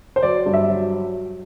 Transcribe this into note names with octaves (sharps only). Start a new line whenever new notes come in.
C5
F#3 D5
G2
E5
F#3